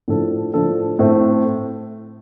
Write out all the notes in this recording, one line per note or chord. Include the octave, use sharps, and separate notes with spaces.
A2 F3 D4 A4
A2 F3 D4 A4
A2 A3 C4